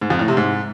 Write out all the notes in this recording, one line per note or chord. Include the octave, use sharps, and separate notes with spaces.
G#2
F2
A2
C3
G#2